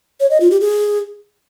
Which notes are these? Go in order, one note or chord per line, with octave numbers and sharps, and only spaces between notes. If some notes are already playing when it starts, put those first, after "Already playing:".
C#5
D#5
F4
G4
G#4